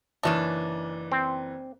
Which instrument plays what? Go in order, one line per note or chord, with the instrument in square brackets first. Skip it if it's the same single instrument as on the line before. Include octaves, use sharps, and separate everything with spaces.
[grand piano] F#1 E3 E7 [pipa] D#3 C#4 D4
[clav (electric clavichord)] C4